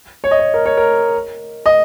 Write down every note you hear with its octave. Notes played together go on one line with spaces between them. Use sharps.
C#5
D#5
C#5
A#4
C#5
A#4
D#5